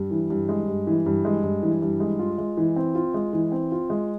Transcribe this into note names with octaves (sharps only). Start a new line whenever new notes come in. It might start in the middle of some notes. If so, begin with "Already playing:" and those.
Already playing: G2
E3
G2
G#3
G2
E3
G2
G#3
G2
E3
G2
G#3
F4
G#3
E3
C4
F4
G#3
E3
C4
F4
G#3